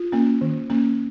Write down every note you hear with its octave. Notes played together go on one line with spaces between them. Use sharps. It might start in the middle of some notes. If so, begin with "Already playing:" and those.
Already playing: F4
A#3 C#4
D#3
A#3 C#4